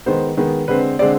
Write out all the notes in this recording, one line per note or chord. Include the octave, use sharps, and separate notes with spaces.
D#3 G#3 B3 C5
D#3 G#3 B3
D3 G#3 C4 B4
D3 G#3 C4 D5